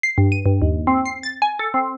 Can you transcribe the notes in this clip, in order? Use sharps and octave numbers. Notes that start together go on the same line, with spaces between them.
C7
G2
D#7
G2
D#2
C4
C7
A6
G#5
A4
C4